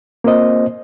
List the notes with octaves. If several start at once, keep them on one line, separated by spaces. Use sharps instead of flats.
A#3 C4 F4 C5 D#5